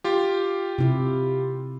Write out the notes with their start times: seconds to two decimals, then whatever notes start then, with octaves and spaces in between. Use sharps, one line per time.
0.04 F4 G4
0.78 C3 E4